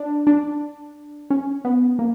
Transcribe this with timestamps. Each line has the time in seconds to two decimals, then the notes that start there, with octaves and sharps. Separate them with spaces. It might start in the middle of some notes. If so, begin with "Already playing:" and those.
Already playing: D4
0.27 D4
1.30 C#4
1.65 B3
1.99 A#3